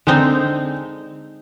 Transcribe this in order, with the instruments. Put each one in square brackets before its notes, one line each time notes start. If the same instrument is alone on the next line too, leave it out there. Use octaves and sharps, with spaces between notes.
[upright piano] D3 [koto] G#3 C4 D#4